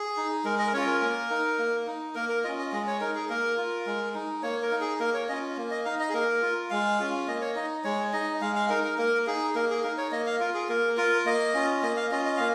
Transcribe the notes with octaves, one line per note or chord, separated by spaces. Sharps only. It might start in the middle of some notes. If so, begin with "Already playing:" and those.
Already playing: G#4
D#4
G#3 A#4
D#5
A#4
C#4 F4 C#5
A#4
A#3
D#4
A#3
D#4
A#3 A#4
A#4
C#4 F4 D#5
D#5
G#3 D#5
C#5
D#4 A#4
G#4
A#3 A#4
F4
G#3
D#4
A#3 C#5
A#4
D#4
G#4
A#3 A#4
C#5
C#4 F4 D#5
A#3
D#5
D#4 F5
D#5
G#4
A#3 A#4
F4
G#3 F5
C#4 F4
A#3 D#5
C#5
D#4 D#5
G#3 C#5
D#4 D#5
G#3 F5
F5
D#4 A#4
A#4
A#3 A#4
D#4 G#4
A#3 A#4
G#4
D#4 A#4
C#5
A#3 D#5
F5
F4 A#4
G#4
A#3 A#4
F4 A#4
A#3 D#5
C#4 F4
A#3 D#5
F5
C#4 F4 D#5
D#5
A#3 F5